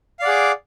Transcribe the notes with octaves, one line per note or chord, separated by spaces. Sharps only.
G#4 D5 F5 F#5 D6